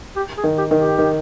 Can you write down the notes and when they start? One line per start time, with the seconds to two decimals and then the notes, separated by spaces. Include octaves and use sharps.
0.16 G4
0.37 G#4
0.44 D#3
0.58 G4
0.71 D#3
0.78 G4
0.98 D#3